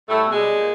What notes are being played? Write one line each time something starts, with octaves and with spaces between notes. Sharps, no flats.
A2 G3 A3
B2
G#3
G3
A#2